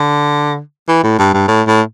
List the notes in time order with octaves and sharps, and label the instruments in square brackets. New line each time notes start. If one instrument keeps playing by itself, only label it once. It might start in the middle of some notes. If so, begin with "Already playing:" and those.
Already playing: [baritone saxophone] D3
E3
A2
G2
G2
A2
A2